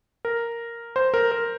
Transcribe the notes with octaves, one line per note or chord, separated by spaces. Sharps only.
A#4
C5
A#4
A#4